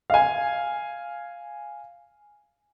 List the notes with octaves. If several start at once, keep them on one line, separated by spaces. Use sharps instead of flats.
F5 G#5